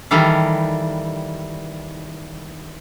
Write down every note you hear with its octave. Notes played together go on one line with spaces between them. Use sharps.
D#3 E3 G3 A4 F5